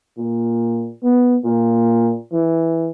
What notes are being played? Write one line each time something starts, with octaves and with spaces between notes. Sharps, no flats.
A#2
B3
A#2
E3